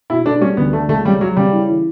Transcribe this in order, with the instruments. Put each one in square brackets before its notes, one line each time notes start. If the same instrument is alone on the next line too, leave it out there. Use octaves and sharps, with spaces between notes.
[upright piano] B2 [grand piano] E4
[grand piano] D4 [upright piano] A4
[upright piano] G3 [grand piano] C#4
[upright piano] D2 [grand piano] B3
[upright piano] D3 [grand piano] A3
[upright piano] C#2 [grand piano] A3
[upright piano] C#3 [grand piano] G3
[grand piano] F#3 [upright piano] C#4
[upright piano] C#3 [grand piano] G3
[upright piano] E4
E3